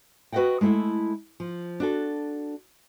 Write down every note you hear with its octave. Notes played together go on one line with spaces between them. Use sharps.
F#4 B4 D5 D#5 F#5 G5
G#3 A3 E4 A4
F3
D4 F#4 A4